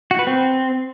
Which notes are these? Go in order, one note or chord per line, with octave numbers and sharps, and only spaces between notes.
F#4
B4
C4